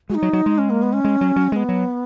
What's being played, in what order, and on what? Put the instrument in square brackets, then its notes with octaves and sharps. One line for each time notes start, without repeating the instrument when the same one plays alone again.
[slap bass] G#3 [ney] D#4 F#4
[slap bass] F#3
F#3
G#3
[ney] C#4
A#3
B3
C#4
[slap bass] G#3
F#3
F#3
[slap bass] G#3 [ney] B3 C#4
[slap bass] F#3